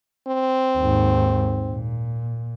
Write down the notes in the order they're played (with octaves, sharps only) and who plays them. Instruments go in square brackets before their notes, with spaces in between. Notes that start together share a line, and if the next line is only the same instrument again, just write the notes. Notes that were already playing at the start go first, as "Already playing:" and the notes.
[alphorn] C4
[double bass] D#2 G#2
A#2